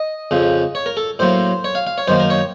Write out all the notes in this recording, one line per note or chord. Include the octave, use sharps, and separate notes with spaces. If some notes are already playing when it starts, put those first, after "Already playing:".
Already playing: D#5
F2 C#3 F3
C#5
A#4
A4
A2 F#3 A#3 C5
C#5
F5
F5
C#5
F#2 D#3 A#3 C5
A#4
C#5